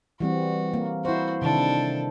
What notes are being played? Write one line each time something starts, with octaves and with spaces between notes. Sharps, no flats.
E3 G3 C4 F#4
A#3
E4 F#4 C5
C3 D#3 D4 E4 A4